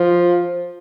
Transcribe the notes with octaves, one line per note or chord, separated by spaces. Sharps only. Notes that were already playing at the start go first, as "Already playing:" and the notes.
Already playing: F3